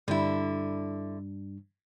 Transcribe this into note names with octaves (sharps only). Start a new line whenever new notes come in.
G2 D3 G3 D4 E4